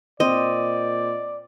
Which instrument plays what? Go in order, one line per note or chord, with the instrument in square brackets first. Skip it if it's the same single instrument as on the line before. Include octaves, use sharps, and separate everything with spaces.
[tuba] A#2 [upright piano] C4 [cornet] D5 [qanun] D#5